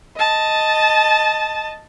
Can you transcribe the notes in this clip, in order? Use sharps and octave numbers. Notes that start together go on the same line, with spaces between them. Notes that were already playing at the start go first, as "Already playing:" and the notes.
D#5 A5